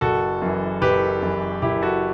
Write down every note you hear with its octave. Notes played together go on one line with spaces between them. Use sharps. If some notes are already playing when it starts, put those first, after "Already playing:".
F#1 F#4 A4
F#2 E3
F#1 G4 B4
F#2 E3
F#1 E4 G4
F#4 A4